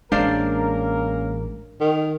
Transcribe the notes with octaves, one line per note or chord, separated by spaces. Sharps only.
A1 G#3 A#3 C#4 D4 A#4 C5 F5
D#3